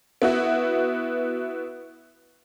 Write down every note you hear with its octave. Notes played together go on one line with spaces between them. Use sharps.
B3 E4 F#4